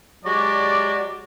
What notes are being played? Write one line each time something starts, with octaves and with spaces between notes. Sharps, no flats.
F#3 G#3 F#4 G4 D5